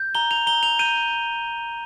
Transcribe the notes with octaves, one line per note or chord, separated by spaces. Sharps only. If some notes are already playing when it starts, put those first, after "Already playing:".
Already playing: G6
A#5 G7
F7
A#5 G7
F7
G6 D#7